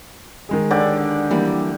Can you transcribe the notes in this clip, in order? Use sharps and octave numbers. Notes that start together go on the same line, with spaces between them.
D#3 G#3 G#4
D3 G4 D5
E3 G3 A#3